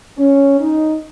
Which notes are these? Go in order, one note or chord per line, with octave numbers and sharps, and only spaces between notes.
C#4
D#4